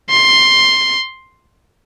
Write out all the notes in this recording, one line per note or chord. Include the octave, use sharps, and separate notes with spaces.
C6